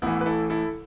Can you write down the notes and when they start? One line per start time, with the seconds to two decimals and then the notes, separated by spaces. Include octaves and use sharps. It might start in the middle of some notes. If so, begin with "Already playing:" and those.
0.02 A1 A2 E3 B3 E4
0.21 B4
0.26 E4 A4
0.50 E4 A4